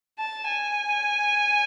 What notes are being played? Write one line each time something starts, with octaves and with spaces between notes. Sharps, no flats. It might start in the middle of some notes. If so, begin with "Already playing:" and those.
A5
G#5